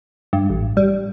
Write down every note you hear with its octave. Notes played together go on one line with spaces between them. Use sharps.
G2
A1
G3